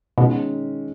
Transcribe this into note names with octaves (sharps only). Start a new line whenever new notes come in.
B2 D#3 G#3 C#4